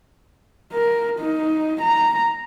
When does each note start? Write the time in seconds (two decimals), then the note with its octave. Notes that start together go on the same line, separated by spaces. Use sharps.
0.73 A#4
1.20 D#4
1.82 A#5